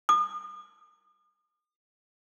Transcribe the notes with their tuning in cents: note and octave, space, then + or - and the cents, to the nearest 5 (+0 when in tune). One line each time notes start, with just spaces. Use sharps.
D#6 -45